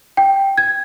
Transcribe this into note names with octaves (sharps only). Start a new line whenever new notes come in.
G5
G#6